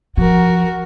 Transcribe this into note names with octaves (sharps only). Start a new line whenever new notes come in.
F3 F#4 A#4